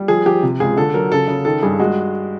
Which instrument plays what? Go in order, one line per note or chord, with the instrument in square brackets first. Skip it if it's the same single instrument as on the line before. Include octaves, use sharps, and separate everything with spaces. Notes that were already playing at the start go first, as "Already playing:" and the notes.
Already playing: [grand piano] G3
F3 G#4
F3 G4
C3
C#2 G#4
D3 A4
F#3 A#4
C#3 A4
C#3
D#3 A4
G2 G#4
G#3 F#4